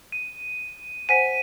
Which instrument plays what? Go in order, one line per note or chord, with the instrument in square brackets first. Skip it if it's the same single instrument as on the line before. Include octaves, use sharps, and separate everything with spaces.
[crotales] D#7
[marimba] C5 F#5 G#5 [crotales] B6 D#7